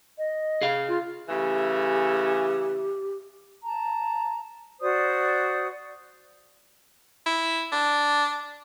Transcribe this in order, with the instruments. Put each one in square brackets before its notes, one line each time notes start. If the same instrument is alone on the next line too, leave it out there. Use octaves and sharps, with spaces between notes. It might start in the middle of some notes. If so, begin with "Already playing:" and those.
[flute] D#5
[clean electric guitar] G#4 F5
[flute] F4
[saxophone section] C#3 E3 A3 [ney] G4
[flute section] A5 A#5
F#4 C5 D5 D#6
[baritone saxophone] E4
D4